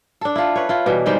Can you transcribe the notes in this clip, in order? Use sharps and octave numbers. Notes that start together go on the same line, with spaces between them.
D4 A4
E4 F4
B4 C#5
E4 F4
B2 E3 G3
D#3 G3 G#3 C4